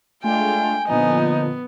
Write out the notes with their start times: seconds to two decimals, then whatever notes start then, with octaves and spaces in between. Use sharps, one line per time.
0.23 G#3 A3 D4 F4 G5 G#5
0.88 A#2 D3 F3 B3 D#4